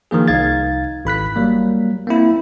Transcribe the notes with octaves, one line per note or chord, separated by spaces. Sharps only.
D#3 F3 A#3 G#4
C2 D#4 F5 G#6 A6
G#1 B5 F#6 B6
F#3 G3 A#3
A#3 C4 E4